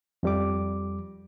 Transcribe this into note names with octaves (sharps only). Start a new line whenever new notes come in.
F2 G3 D6